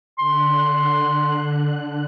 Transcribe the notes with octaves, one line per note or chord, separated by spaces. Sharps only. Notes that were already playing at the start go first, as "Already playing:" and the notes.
D3 C6 F#6